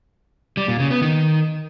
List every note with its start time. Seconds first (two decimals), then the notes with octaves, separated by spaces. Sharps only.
0.57 G3
0.68 A#2
0.79 C#3
0.91 B3
1.02 D#3